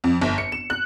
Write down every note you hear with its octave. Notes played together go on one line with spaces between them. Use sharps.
F2
G1
C#7
E7
F#6